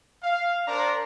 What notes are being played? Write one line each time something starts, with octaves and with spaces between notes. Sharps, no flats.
F5
D4 A#4 C5 D5 A#5